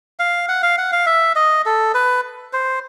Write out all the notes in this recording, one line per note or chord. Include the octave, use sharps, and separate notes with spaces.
F5
F#5
F5
F#5
F5
E5
D#5
A4
B4
C5